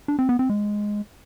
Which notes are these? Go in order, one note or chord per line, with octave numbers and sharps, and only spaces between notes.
D4
C4
B3
C4
G#3